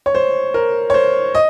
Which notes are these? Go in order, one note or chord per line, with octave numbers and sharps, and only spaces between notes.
C#5
C5
A#4
C#5
C5
D#5